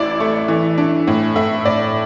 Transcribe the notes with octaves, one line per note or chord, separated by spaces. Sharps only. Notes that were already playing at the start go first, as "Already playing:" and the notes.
Already playing: A1 E4 D5
A3
E3
D4
A2
A2 E5
A2 D5